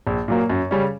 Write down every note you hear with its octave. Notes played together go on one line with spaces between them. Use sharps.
A#1
A#2 F#3 A#3
F#2
C#3 G3 C#4